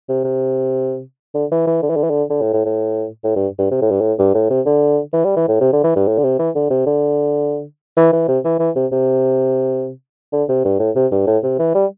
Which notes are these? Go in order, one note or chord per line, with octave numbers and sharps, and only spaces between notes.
C3
C3
D3
E3
E3
D3
E3
D3
E3
D3
D3
A2
A2
A2
A2
G2
G2
C3
A2
G2
A2
G2
A2
C3
D3
E3
G3
E3
A2
C3
D3
E3
G2
A2
D3
C3
E3
D3
C3
D3
E3
E3
C3
E3
E3
C3
C3
D3
C3
G2
A2
C3
G2
A2
C3
E3
G3